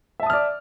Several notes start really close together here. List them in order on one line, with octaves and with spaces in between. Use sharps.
E5 A5 D#6 F6 D5